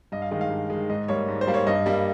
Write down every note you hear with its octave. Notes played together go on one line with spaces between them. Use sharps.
G2 D#5
F5
D#3 G#3 D#5
F5
G2
D#3 G#3
G#2 D#5
G3 A#3 C#5
G#2
C5
G3 A#3
C#5
G2 D#5
G3 A#3